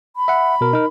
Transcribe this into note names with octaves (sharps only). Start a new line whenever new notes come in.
B5
E5 F#5
B2 A#4
D#4 A#4